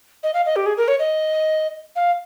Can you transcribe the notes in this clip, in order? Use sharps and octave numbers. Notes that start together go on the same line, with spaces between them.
D#5
F5
D#5
G4
G#4
A#4
C#5
D#5
F5